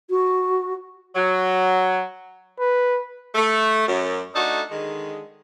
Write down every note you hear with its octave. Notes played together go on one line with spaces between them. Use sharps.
F#4
F#3
B4
A3
F#2
A3 D4 D#4 F#4 A4
D3 D#3 G#3